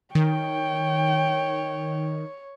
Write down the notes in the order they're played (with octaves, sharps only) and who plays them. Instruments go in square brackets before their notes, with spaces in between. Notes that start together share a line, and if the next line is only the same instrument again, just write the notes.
[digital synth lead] D#3 [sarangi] C#5 [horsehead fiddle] G5